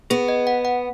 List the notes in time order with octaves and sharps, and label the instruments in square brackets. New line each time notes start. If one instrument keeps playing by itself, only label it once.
[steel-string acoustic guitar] B3 [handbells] G#4
[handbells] D#5
F#5
F#5